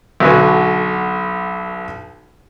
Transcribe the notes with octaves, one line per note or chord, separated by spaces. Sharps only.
B1 D3 F#4 B4 G#5